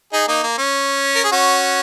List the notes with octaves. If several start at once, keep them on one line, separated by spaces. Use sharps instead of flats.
D#4 G#4
A#3 D#4
A#3
C#4
A#4
G#4
C#4 F#4